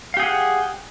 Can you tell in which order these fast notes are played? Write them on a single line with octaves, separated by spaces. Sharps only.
F5 G4 G#4 F#5